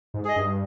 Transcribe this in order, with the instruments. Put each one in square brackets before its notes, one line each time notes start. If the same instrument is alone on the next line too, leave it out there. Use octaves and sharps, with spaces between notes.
[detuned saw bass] G#2
[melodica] G#4 D#5
[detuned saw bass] G2